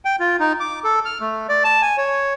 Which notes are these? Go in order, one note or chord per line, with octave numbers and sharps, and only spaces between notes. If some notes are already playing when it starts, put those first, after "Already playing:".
G5
F4
D#4
D6
A4
F6
A3
D5
A5
G#5
C#5